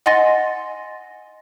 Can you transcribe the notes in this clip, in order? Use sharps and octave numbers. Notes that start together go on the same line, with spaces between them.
D#5 F#5 G#5 C6 A6 A#6